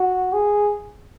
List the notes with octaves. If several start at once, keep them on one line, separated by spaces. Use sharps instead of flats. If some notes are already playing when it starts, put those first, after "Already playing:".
Already playing: F#4
G#4